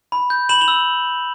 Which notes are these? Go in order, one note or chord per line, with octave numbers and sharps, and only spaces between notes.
B5
G6
B5 E7 F#7
F7 G7
E6